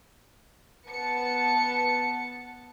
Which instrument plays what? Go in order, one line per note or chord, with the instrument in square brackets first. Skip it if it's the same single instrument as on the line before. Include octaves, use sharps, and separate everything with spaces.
[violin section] B3 A5 C#7